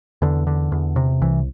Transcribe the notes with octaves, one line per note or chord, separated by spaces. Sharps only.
E2 D3
D3
E2
C3
C2 E3